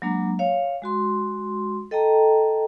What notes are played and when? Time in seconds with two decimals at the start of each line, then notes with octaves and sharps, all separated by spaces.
0.02 F#3 G#3 A#3 D4 A#5
0.39 C#5 F5
0.82 G#3 F#4 C6
1.91 A4 D#5 G5 A5 A#5